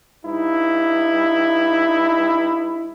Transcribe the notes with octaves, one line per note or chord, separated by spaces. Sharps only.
G2 D#4 E4